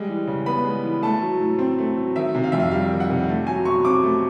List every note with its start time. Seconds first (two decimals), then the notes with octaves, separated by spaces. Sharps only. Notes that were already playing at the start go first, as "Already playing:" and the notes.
Already playing: G3 G#3
0.09 E3
0.27 C#3
0.46 B3 B5
0.65 G#3
0.84 E3
1.03 A3 A5
1.22 F#3
1.40 A2
1.59 C4
1.78 A3
1.97 F#3
2.16 D#3 E5
2.35 C3
2.44 F5
2.52 F2 E5
2.60 F5
2.71 G3 F5
2.91 D#3
3.00 F#5
3.10 C3
3.29 A3
3.47 F#3 G#5
3.65 B2 C#6
3.85 C4 D6
4.04 A3